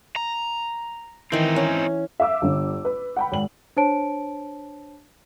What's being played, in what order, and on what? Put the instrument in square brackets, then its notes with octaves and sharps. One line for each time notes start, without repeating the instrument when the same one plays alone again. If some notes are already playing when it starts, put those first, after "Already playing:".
[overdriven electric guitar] A#5
[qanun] D#3 E3 [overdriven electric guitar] C4 D#4
[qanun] C#4
[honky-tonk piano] E5 F5 D6 E6
G1 D3
B4
F#5 G5 B5
G#1 F#7
[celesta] D4 C5 C#5 A5 D7